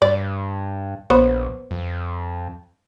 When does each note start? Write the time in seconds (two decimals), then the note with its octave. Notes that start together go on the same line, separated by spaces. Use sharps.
0.02 G2 D5
1.10 A#1 B3 C5 C#5
1.71 F2